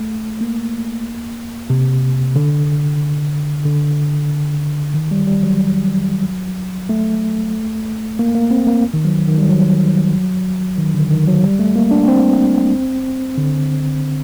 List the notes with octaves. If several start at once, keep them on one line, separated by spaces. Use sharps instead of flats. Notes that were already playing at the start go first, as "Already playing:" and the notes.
Already playing: A3
A#3
C3
D3
D3
D#3
G3
G3
F#3
A3
A#3
A#3
C4
A#3
D#3
F#3
D#3
G3
F#3
D#3
D3
D#3
F#3
G3
A3
A#3
D4
C4
D3